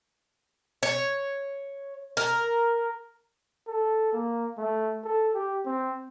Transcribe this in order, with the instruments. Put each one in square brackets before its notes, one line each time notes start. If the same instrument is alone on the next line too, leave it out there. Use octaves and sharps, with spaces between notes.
[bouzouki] C#5
A#4
[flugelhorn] A4
A#3
A3
A4
G4
C4